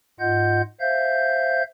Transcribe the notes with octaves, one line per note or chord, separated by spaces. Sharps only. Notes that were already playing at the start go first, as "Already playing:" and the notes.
G#2 F4 D#5 F#5 G6
C5 E5 F5 G6